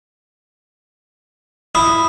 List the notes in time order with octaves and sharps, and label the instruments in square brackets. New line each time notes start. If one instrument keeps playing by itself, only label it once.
[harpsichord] E4 [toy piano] D#6